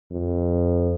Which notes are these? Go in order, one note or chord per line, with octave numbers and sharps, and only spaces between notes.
F2